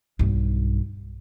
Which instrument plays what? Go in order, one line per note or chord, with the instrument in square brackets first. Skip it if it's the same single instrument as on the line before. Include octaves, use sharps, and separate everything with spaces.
[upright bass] B1 G2